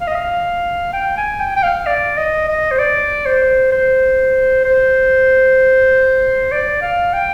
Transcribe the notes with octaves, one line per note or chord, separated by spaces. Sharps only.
F5
D#5
F5
G5
G#5
G5
G5
F5
D5
D#5
D#5
C5
D5
C5
C5
C5
D5
F5
G5